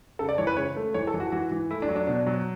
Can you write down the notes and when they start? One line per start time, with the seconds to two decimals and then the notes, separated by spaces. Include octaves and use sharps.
0.19 C#3 A4
0.29 D5
0.38 E3 C#5
0.47 B4
0.57 C#3 C#5
0.76 A3
0.94 E3 C#5
1.07 A4
1.14 E3
1.20 F#4
1.32 E3 F#4
1.52 E3
1.71 A3 E4
1.82 D4
1.89 F#3
1.96 D4
2.07 B2 D4
2.26 F#3